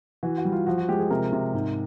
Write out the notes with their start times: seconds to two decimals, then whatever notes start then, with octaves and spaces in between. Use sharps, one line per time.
0.23 E3 F#4
0.38 F#4
0.45 G3
0.52 F4
0.66 F3 F#4
0.78 F#4
0.89 G#3 G4
0.99 G#4
1.10 C3 A#4
1.33 C3
1.54 G#2